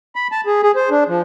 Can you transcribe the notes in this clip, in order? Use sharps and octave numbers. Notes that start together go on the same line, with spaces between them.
B5
A5
G#4
G#4
C5
D4
F3